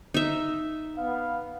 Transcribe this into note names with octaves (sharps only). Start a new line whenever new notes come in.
D#4 E5
B3 F5